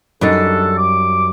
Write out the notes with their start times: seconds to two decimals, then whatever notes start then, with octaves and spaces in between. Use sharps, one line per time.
0.21 F#2 G3 D4 D#4 A4
0.77 D6